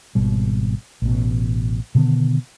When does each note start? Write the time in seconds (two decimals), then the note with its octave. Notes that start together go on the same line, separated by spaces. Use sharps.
0.15 G#1 B2 G3
1.02 A1 B2
1.95 B2 D3 D#3 B3